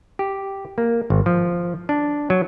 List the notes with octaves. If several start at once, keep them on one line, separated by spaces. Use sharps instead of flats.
G4
A#3
G#1
F3
D4
F#3